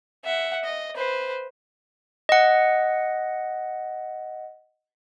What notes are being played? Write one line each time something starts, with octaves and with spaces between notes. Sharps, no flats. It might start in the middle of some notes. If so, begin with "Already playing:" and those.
E5 F#5
D#5
B4 C5
D#5 F#5